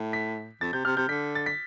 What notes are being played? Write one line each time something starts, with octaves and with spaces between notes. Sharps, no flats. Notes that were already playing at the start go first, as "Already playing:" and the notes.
Already playing: A2
B6
F2 A6
C3 G6
C3 F6
C3 G6
D3 B6
A6
B6